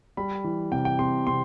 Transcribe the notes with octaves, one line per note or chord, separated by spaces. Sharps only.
G3 B5
E3
C3 G5
G5
C3 C6
C3 C6